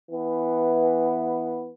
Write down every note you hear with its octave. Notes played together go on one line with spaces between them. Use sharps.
E3 B3